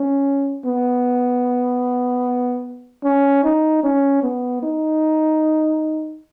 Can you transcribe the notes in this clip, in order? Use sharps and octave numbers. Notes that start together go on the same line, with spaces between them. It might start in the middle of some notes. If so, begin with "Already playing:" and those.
Already playing: C#4
B3
C#4
D#4
C#4
B3
D#4